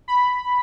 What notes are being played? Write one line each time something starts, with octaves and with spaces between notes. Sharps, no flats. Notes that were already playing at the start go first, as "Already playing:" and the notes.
B5